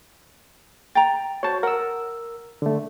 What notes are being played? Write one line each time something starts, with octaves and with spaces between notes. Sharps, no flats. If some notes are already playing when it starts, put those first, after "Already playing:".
G5 A#5 A6
F#4 C5 C#5 A5
A#4 F#5 E6
D3 A3